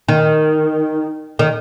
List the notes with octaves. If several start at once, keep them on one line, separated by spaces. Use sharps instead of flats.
D#3
D#3